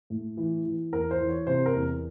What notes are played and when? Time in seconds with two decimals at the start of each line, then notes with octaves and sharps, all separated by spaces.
0.10 A2
0.37 E3
0.65 E3
0.92 E2 A#4
1.11 C5
1.20 E3
1.29 C#5
1.47 C3 C5
1.66 A#4
1.75 E2